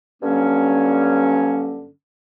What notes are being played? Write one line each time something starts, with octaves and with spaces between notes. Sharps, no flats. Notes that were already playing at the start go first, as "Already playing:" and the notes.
G2 D3 F#3 A#3 C#4